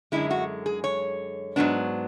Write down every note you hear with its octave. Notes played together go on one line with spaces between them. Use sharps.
F#2 D3 G#3 E4
F#4
G#4
C#5
G#2 F#3 B3 D4